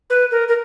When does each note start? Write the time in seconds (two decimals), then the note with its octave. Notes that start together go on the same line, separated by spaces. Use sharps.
0.10 B4
0.31 A#4
0.48 A#4